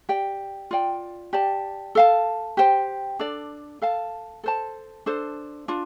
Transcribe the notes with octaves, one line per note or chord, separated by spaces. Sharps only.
G4 D5 G5
F4 D5 G5
G4 D5 A5
A4 F5 A5
G4 C5 G5
D4 A4 D5
A4 F5 A5
A4 C5 A5
D4 A4 C5
D4 F4